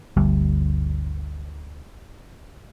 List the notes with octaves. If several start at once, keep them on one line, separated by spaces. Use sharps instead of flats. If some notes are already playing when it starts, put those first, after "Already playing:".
G1 D2 G3